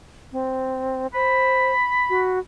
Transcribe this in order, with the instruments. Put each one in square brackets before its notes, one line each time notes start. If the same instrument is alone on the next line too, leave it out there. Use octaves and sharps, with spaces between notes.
[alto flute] C4
[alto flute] C5 [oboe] B5
[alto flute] F#4